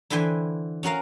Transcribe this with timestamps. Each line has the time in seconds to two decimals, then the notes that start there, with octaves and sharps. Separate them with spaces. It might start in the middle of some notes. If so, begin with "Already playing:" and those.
0.10 D3 E3 B4 C5 G5 G#5
0.83 C#4 F#4 A#4 F5